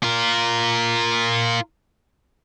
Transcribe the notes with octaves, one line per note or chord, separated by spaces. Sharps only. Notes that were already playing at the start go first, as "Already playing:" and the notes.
F4 A#4